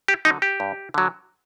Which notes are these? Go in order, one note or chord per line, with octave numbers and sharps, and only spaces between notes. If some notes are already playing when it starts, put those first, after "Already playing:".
G4
D3 F#3 D#4
G4
G2
D3 F#3